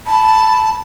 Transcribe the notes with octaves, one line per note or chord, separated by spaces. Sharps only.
A5 B5